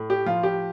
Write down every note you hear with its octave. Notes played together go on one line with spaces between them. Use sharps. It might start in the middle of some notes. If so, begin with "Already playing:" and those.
Already playing: A2
G4
F3 F4
G4